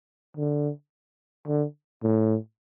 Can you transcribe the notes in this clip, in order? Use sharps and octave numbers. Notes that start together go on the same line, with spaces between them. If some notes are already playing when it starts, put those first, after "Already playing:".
D3
D3
A2